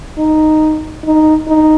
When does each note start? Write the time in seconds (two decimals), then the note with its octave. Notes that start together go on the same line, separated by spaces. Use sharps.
0.18 D#4
1.05 D#4
1.48 D#4